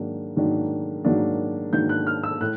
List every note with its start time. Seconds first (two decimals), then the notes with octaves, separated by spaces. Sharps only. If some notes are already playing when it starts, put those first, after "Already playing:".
Already playing: G#2 D#3 F#3 A#3 D4
0.36 G#2 D#3 F#3 A#3 D4
1.05 G#2 D#3 F#3 A#3 D4
1.73 G#2 D#3 F#3 A#3 D4 G6
1.89 F#6
2.07 F6
2.23 E6
2.41 A2 F#6